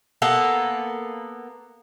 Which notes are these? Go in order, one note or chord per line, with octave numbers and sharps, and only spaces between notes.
A#3 B3 A4